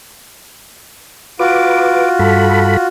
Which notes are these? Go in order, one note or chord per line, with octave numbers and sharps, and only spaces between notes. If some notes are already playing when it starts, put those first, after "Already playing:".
F4 F#4 B4 D6
G2 A4 B5